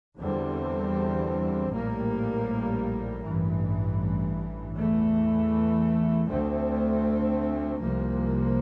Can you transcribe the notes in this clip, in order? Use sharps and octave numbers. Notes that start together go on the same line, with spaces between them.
E2 D3 G3 C4
A#1 A2 G3 A#3
A1 G2 E3
E2 E3 A3
D2 D3 A3 C4
C2 C3 F3 A#3